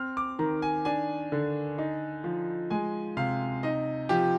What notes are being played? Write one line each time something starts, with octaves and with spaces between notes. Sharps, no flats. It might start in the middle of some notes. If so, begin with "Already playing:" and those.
Already playing: C4 F6
D6
D#3 A#5
G#5
D4 G#5
D3
D#4
F3
G#3 G#5
C3 F5
D#4 D#5
F3 G4